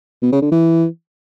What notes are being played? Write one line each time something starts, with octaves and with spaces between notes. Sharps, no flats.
B2
C#3
D3
E3